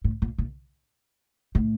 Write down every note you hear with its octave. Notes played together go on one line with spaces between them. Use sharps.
A2
A#2
A#2
A2